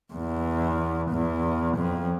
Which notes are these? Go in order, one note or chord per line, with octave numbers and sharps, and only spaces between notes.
E2
E2
F2